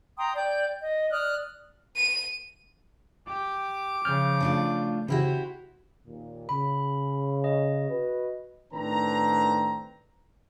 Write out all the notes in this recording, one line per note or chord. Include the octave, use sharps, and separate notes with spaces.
G5 A#5 C6 D#6
D5 G5 G6
D#5
D5 D#6 F6 F#6
D#7
G4 D6
C#3 F3 F6 G6
A3 D4 F4
C#3 E4 F#4 G4 C5
D#2 A#2
C#3 B5
D#5
F#4 B4
A2 D#3 C4 D4 B4 A#5